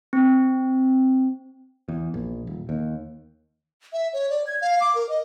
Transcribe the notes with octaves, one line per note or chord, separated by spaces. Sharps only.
C4
E2
A#1
D#1
D#2
E5
C#5
D5
G#6
F5
D6
A#4
D#5